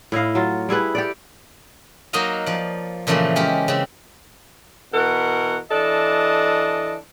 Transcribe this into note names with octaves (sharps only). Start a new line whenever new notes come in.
A2 E4 D#5 F5
F#3 F4
G3 E4 G#4 B4
G4 A4 D5
F#3 A#3 D#4 F#4 D#5 F5
F3 D5
A#2 C#3 E3 F3 A3 A#3
G#3 C#4 G4
C#3 C4
B2 E3 A#4 F#5
E3 D4 A4 D#5